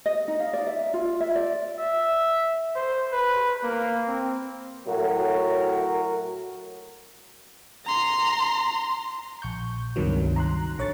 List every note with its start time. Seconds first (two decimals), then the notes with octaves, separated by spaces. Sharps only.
0.06 D#5
0.28 D#4
0.40 F5
0.53 D5
0.67 E5
0.94 F4
1.20 E5
1.35 D5
1.79 E5
2.75 C5
3.13 B4
3.63 A#3
4.08 C4
4.87 A2 F#3 F#4 A#4
7.85 A#5 C6
9.42 A#1 C#6 G6
9.96 C#2 G2 C3 D#3 F#3
10.36 A#5 C6 F#6
10.78 A#1 D3 C#5 C#6 A6